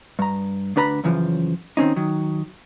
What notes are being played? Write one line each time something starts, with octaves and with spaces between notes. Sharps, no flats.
G2 A#5
D2 D4 B4 A#5 B5
F#2 C#3 E3 F3
D#3 C4 C#4 D#4
D#3 F#3